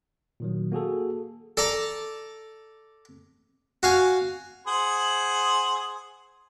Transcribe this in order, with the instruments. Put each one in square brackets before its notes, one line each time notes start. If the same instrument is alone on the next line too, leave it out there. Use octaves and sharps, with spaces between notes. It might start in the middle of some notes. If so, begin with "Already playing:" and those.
[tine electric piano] A#2 D#3 F#3
A#3 F#4 G#4 A4
[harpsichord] A4 D5 A5 A#5
F#4 F5 G#5
[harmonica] G#4 C5 F#5